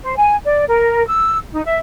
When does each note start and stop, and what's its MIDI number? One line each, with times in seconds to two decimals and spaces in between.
0.03 0.15 72
0.17 0.35 80
0.46 0.64 74
0.68 1.05 70
1.06 1.37 88
1.52 1.61 63
1.65 1.78 76